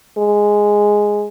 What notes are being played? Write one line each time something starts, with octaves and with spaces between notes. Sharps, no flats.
G#3